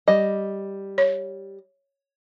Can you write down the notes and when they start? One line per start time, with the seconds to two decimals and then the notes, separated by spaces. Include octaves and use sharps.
0.08 G3 D#5
0.98 C#5